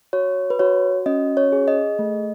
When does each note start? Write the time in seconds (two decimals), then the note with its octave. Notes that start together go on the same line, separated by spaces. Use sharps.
0.13 F#4 C#5
0.50 B4
0.59 F#4 C#5
1.06 C#4 D#5
1.37 C#5
1.52 G#4
1.68 D#5
1.99 A3